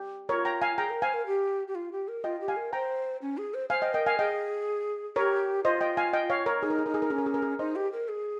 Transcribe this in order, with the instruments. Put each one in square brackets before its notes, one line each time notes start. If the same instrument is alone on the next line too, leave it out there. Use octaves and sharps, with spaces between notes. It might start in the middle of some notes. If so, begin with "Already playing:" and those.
Already playing: [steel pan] G4
[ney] F4 [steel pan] A#4 C#5
[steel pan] G5 A#5
F5 G#5
[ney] G#4 [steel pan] G5 A#5
[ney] A#4
[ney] C5 [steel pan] F5 G#5
[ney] A#4
G4
G4
F4
G4
A#4
[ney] F4 [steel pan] D#5 G5
[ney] G4
[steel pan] F5 G#5
[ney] A#4
[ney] C5 [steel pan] G5 A#5
[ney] C#4
G#4
C5
[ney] C5 [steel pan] F5 G#5
[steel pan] D#5 G5
[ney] A#4 [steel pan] D#5 G5
[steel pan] F5 G#5
[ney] G#4 [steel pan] D#5 G5
[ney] G4 [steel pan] A#4 C#5
[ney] F4 [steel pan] C5 D#5
[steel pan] D#5 G5
F5 G#5
D#5 G5
C#5 F5
A#4 C#5
[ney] D#4 [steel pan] G#4
[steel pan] A#4
G#4
[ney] D#4 [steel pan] A#4
[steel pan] G#4
A#4
[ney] C#4 [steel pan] G#4
[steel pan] A#4
G#4
A#4
G#4
[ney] D#4 [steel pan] C5 D#5
[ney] G4
A#4
G#4